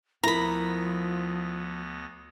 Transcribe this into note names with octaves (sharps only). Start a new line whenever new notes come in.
D2 F3 B3 E4 A#4 A#5 B5 A#6